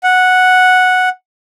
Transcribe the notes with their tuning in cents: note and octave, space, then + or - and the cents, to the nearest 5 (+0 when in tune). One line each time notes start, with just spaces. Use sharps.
F#5 -5